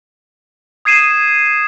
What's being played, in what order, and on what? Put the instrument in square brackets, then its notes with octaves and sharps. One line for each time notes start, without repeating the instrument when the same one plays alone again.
[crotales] D#6 G#6 C7 D#7 E7